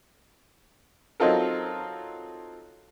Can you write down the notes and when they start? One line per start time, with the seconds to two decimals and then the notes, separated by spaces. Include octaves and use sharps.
1.20 F#3 C4 D#4 F4 A4 A#4